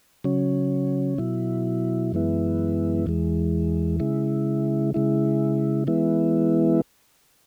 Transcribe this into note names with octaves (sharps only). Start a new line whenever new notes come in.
C#3 F#3 C#4
B2 F#3 E4
F#2 E3 G#3 B3 E4
E2 E3 G#3
C#3 G#3 E4
C#3 G#3 E4
E3 G#3 B3 E4